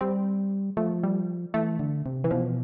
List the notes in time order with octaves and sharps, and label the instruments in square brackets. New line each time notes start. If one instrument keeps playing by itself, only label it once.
[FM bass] G3 [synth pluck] C4
[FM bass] F3 [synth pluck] A3
[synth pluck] G3
[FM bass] E3 [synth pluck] A3
[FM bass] D3
C3
[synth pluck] E3
[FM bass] B2 [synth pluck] F3